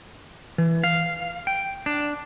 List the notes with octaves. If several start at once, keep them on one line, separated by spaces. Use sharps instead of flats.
E3
F5
G5
D4